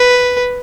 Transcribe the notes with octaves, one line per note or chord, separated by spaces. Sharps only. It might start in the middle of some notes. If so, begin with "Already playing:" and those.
Already playing: B4